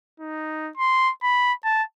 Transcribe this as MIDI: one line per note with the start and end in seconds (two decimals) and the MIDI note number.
0.20 0.71 63
0.78 1.11 84
1.23 1.53 83
1.65 1.83 81